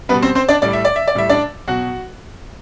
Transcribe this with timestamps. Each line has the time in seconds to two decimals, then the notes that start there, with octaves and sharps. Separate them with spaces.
0.09 G3 B3 B4
0.14 B2
0.22 C4 C5
0.35 C4 C5
0.48 D4 D5
0.62 A2 G3 D5
0.73 E5
0.85 D5
0.96 E5
1.08 D5
1.15 A2 G3 E5
1.30 D4 D5
1.68 B2 F#3 F#4 F#5